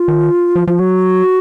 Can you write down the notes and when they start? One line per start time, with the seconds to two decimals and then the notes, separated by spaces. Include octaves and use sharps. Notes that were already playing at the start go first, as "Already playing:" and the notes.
Already playing: F4
0.08 D#3
0.56 F3
0.67 F3 F4
0.79 F#3 F#4